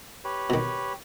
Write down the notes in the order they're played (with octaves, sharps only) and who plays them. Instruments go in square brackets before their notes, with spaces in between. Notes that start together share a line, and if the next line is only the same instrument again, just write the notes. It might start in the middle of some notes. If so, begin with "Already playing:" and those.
[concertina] G4 B4 C#5
[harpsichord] B2 D#3